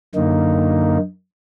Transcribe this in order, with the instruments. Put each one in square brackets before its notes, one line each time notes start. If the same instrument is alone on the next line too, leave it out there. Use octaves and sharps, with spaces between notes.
[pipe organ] F#2 D3 A#3 D#4